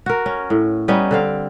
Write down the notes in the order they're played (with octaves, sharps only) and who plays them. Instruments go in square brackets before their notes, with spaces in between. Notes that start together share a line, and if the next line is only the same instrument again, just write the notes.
[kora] F#4 A#4
C#4
A2
G3 B3 C#4 D#4
D3 C4 F5